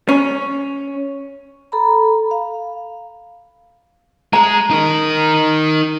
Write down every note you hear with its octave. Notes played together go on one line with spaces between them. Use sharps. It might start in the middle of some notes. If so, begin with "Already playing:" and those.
C#4
A4 A#5 B5
F5
G#3 G#4 A#5
D#4 A#4